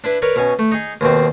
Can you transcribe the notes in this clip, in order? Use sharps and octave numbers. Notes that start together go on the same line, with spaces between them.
D4 E4 B4
A#4 B4 C#5 D5
B2 C#4 G#5
A3
D#4 G#4
D#2 B2 C4